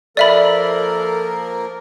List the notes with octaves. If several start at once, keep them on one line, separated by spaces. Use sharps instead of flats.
F3 A#3 A4 A#4 D5 E5 B5